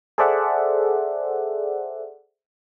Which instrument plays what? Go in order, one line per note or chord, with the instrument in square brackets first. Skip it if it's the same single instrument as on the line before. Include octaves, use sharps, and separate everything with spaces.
[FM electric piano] G#4 A4 C5 D5 E5 F#5